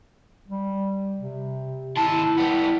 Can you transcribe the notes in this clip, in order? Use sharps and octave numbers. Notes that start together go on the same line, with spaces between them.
G3
C3
D#3 E4 A5
G3 B3 E4